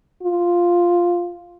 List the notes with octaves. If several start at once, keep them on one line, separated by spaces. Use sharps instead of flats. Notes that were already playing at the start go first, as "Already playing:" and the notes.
F4